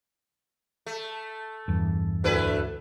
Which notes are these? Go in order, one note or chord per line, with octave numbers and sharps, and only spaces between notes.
A3
E2 G2
D2 A3 E4 B4